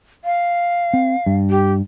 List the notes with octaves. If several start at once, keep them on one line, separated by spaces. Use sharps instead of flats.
F5
C4
G2
G4